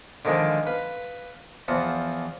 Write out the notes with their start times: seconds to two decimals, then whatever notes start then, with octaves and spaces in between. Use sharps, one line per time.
0.25 D3 D#3 F3 G#3 D4
0.67 B4 F5
1.68 E2 F3 F#5 A5